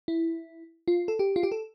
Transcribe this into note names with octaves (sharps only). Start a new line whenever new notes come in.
E4
F4
A4
G4
F4
G4
A4